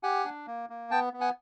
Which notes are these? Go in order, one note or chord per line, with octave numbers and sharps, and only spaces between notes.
G4 F#5 G#5
D4
A#3
A#3
B3 G5 A5
B3
F#5 G#5